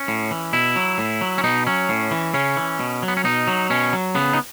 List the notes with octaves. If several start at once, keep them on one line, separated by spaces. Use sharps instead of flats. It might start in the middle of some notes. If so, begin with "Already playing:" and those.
Already playing: C#4
A2
E3
B2 E4
F#3
A2
F#3
C#4
B2 D#4
F#3 C#4
A2
E3
C#3 C#4
E3
B2
F#3
B3
C#4
B2 D#4
F#3
B2 C#4
F#3
C#3 B3
D#4